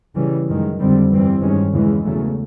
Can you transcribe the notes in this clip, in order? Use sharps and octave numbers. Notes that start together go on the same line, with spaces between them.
C#3 E3 G3
F#2 D#3 G#3
F2 D3 G3 C4
G2 E3 G3 C4
G2 D#3 G#3 C#4
E2 C#3 E3 G#3
E2 C#3 F#3 A3